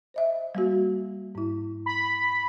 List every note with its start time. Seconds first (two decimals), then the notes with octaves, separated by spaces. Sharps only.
0.14 C5 D#5 E5
0.55 G3 A#3 F#4
1.35 G#2 E4
1.86 B5